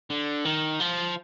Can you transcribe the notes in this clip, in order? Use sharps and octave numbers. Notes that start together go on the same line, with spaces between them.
D3
D#3
F3